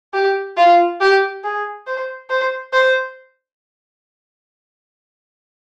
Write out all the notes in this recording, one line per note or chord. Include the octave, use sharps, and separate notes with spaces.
G4
F4
G4
G#4
C5
C5
C5